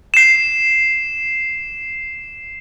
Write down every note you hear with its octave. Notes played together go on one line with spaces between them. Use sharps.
C7 E7